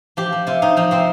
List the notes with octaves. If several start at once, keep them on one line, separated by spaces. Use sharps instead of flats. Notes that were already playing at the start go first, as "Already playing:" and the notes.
F3 G4
F3
C3 F4
C3 D#4
F3 D#4
C3 C4